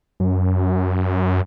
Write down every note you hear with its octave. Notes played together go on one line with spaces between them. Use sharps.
F#2